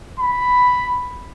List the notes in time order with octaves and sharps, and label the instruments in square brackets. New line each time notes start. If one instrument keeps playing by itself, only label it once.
[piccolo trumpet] B5